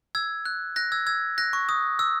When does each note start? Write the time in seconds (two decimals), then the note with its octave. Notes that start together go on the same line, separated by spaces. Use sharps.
0.15 E6 G#6
0.46 F#6
0.76 F#6 A#6
0.92 E6 G#6
1.07 E6 G#6
1.38 F#6 A#6
1.53 C#6
1.69 D#6
1.99 E6